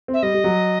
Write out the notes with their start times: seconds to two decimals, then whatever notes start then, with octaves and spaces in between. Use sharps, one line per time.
0.08 C4
0.13 E5
0.23 G3 D#5
0.34 G3
0.44 F#3